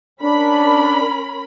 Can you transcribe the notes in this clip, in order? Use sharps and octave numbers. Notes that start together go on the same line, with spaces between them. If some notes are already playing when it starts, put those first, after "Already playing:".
C#4 D4 A#4 B5